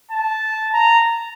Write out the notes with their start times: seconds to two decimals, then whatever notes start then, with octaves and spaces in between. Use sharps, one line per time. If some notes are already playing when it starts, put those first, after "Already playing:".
0.11 A5
0.74 A#5